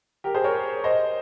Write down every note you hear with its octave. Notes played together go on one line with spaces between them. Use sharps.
G4 A#4
G#4 C5
A#4 C#5
C5 D#5